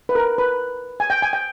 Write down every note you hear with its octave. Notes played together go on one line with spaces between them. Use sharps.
B4
A#4
B4
G#5
G5
G#5
G5